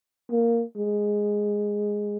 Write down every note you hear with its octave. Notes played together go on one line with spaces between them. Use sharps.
A#3
G#3